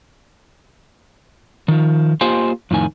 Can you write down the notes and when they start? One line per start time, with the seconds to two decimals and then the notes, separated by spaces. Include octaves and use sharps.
1.68 D#3 F3
2.21 A#3 F4 G4 C5 D#5 G#5
2.71 F2 A2 D#3 G#5